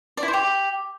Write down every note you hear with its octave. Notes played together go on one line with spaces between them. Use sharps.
D5
E4
C5
G4